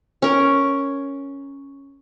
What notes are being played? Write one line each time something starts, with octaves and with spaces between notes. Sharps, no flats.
C#4 A#4